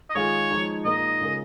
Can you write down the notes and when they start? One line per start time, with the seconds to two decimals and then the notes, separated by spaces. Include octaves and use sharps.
0.10 D#5
0.15 D#3 G#3 F4 G#4 C#5
0.50 F3 G#3 D#4
0.84 A#2 A#3 D#4 G#4 D#5
1.21 C#3 G#3 F4 A#4